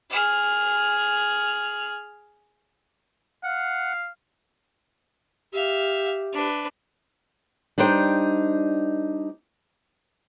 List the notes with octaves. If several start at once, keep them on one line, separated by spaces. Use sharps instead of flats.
G#4 F6
F5 F#5
G4 E5 F5
D4 B4
G3 D4 D#4 C5 G5